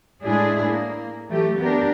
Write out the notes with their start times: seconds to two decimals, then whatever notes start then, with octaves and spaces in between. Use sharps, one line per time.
0.23 A2 G#3 D4 E4 G#4
0.66 A#3
1.28 E3 F#3 A3 G4
1.60 B3 D4 G4 A#4